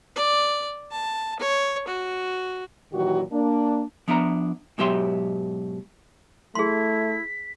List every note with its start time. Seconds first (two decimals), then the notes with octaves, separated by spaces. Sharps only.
0.16 D5
0.91 A5
1.39 C#5
1.88 F#4
2.92 A#2 D#3 E3 F#3 F#4 G4
3.32 A#3 D4
4.08 F3 B3 D4 E5 A#5
4.78 G#2 B2 F#3 G4 E5 C6
6.55 A3 E4 G#4 C6 B6